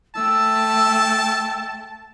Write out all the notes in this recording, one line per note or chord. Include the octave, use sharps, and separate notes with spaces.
A3 G5 A5 E6